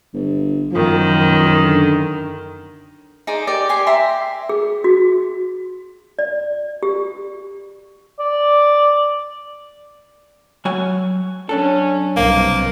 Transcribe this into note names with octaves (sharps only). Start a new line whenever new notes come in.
G1
F#2 D#3 F3
B1
D3
D#4 G#4 C5 D5
G4 A#4 D5
G4 G#5 C6
G4 E5 A#5 C6
G#4
F#4
D5
G4
D5
F#3 F#4 G#5
F#2 C#4 D4 A4
C2 B2 A#3 C5